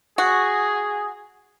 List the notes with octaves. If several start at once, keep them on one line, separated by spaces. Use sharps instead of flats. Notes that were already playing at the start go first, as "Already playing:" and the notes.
F#4 G#4